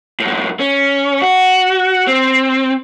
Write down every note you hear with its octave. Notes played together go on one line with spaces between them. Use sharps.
F#2 A2
C#4
F#4
C4